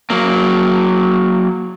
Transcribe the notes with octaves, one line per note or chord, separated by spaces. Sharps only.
F#3 A#3